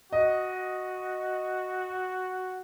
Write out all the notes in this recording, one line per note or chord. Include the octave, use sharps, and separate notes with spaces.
F#4 D#5